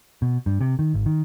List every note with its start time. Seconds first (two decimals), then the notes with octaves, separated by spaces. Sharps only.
0.22 B2
0.46 G2
0.60 C3
0.79 D#3
0.94 G#1
1.06 D#3